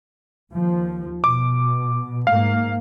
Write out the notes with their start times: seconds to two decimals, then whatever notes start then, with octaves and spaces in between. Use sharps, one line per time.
0.52 D#2 F3
1.24 B2 D6
2.27 G#2 A#3 F5